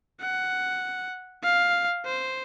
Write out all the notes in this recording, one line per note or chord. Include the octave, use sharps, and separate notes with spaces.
F#5
F5
C5